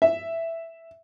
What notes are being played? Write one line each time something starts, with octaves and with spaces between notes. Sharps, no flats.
E5